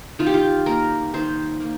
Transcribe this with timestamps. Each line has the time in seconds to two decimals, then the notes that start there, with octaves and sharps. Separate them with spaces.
0.19 D#3 F4
0.26 G4
0.34 F4
0.66 A#3 A#4
1.14 D#3 C5
1.60 A#3